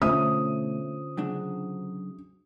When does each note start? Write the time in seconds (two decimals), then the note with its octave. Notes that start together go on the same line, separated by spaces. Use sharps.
0.02 B2 D3 A3 C#4 F4 C5 E5 D#6
1.17 C#3 F#3 D4